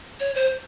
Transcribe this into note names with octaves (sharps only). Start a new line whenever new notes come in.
C#5
C5